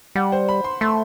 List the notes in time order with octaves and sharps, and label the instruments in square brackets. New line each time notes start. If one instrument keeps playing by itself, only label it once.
[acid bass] G3 [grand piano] F#5
[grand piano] C5
B5
C6
[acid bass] A3 [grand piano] C6